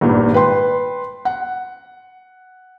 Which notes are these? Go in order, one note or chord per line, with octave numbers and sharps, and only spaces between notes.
G#1 G2 A#2
B4 G5 C6
F#5